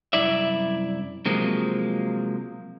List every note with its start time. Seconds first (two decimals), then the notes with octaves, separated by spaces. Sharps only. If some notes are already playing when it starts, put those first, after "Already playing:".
0.13 C2 F#2 E4 D5 E5
1.26 C3 F3 F#3 G#3 A#3